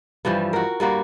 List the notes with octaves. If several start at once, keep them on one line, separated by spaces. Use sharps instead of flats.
G2 E3 F3 G3
F#4 A#4
G2 G3 A#3 F#4